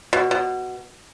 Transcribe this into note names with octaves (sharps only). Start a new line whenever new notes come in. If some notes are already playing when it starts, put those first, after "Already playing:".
B2
B2